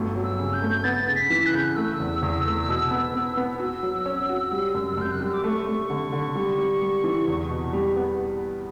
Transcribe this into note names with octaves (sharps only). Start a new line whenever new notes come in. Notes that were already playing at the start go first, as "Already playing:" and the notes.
Already playing: G1 F#3 A3
F#3
E6
C#3
G6
A3
B3 A6
C#3
B6
E3
F#6
C#3 G6
F#6
A3 E6
E2
E2
A3
B2
B3
B3
B3
F#4 E6
F#3
C#4
F#4
G3
F#2
F#2 G6
F#6
G3 E6
D6
A3 C#6
A3
D3
D3
G3
G3
G3
E3
E2
B2
G3
B3